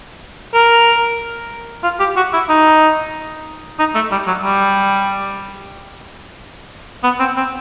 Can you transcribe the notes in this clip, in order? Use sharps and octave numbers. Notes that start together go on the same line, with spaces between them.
A#4
F4
G4
F#4
E4
D#4
D#4
A3
G3
F#3
G3
B3
C4
C4